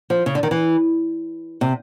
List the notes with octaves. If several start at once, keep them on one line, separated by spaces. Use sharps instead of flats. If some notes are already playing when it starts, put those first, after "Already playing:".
F3
C#3
D3
D#3
E3
C3